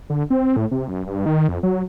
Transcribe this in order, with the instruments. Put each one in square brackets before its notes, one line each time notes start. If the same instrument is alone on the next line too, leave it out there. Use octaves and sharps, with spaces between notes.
[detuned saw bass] D3
C4
A2
C3
F#2
G2
D#3
F2
F#3